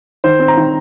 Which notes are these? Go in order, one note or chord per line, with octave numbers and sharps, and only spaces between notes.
D#3 C5
C4
A#5
D#3